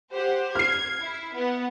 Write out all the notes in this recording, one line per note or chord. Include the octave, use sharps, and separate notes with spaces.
G4 C5 F#5
F6 G#6 C7
E4
B3 F#5